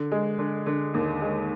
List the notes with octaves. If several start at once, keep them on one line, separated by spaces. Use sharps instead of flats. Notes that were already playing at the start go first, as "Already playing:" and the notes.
Already playing: D3
G#3
D3
D3
D#2
G#3